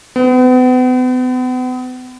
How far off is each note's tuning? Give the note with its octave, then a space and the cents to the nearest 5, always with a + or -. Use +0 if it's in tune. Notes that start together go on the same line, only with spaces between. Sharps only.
B3 +40